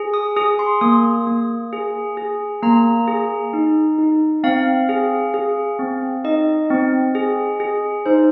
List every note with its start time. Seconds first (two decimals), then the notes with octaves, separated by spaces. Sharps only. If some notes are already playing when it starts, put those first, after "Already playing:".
Already playing: G#4
0.14 D#6
0.37 G#4 D#6
0.59 C6
0.81 A#3 D#6
1.27 A#3
1.73 G#4
2.17 G#4
2.63 A#3 A#5
3.08 G#4
3.53 D#4
3.99 D#4
4.44 C4 F5
4.89 G#4
5.34 G#4
5.79 C4
6.25 D#4 D#5
6.70 C4
7.15 G#4
7.60 G#4
8.06 D#4 C5